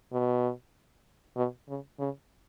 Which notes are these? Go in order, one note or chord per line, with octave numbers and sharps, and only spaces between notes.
B2
B2
C#3
C#3